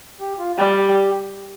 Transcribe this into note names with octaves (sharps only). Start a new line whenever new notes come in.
G4
F4
G3 G4